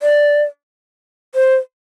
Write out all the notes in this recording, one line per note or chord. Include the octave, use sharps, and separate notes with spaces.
D5
C5